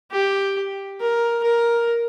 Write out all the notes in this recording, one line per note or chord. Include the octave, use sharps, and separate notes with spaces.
G4
A#4
A#4